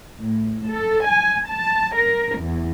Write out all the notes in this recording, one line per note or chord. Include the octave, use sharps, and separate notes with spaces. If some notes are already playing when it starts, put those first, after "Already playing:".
A2
A4
G#5
A5
A#4
E2